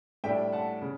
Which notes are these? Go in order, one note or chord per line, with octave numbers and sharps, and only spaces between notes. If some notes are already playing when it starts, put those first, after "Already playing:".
A2 G3 D4 E5 G5
F#5 A5
C#3